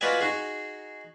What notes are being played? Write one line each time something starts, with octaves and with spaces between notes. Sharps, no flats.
F4 F#4 B4 D5 D#5 G#5
D#4 F#4 G#4